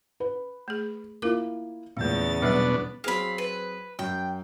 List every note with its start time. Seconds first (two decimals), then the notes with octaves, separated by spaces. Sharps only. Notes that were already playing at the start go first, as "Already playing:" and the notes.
0.20 B4
0.68 A3 G#4
1.22 A#3 E4 F4 A#4 D6
1.97 E2 A#2 C#3 G#3 A3 A6
2.42 B2 F#3 G3 B3 D4
3.04 F#3 C4 G#4 F5 B5
3.38 B4
3.99 F#2 G5